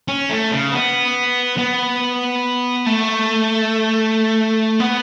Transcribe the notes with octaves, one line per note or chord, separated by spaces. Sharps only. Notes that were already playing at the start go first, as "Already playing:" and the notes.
C#4
A3
C#3
B3
B3
A3
B3